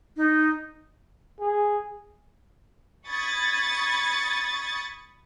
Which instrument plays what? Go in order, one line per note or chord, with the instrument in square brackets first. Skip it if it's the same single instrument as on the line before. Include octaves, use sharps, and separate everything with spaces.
[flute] D#4
[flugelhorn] G#4
[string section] B5 C#6 D#6 G#6 A6